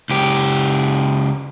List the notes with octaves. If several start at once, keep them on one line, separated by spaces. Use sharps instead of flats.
C#2 G4